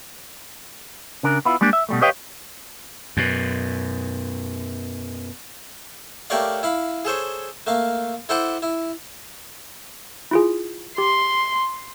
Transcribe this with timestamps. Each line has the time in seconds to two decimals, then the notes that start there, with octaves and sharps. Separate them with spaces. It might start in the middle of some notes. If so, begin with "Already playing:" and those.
1.23 C#3 D4 A#4
1.45 B3 E4 F4
1.61 G3 G#3 A#3 D4
1.73 E5
1.89 B2 G3 A3
2.01 G4 B4 C#5 D#5 F5 G5
3.17 F#2 B2
6.30 A3 G4 A#4 C#5 D5 F5
6.63 E4 F5 B5
7.05 G#4 A4 C5 C#5
7.67 A3 A#3 F5
8.29 E4 A4 C5 F#5 A5 D6
8.62 E4
10.31 E4 F4 G#4
10.98 G4 C6